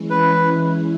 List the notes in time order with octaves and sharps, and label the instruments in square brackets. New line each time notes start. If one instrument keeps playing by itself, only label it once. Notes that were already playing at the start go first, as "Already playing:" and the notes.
Already playing: [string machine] E3 G#3 C#4 E4
[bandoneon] B4